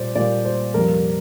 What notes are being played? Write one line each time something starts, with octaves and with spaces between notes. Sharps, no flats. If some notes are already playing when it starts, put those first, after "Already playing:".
Already playing: A#2 G3 A#3 C5 D5
A#2 G3 A#3 D5
C5
F2 C3 G3 A#3 A#4